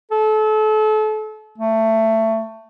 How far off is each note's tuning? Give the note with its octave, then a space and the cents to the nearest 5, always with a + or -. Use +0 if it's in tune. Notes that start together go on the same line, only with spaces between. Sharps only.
A4 -35
A3 +15